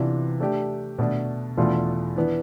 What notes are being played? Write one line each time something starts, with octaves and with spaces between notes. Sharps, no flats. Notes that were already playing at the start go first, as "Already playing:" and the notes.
Already playing: C3 E3 B3 D4 F4
A3 D4 G4
B2 A3 D4
E2 B2 A3 D4 F4
E3 B3 D4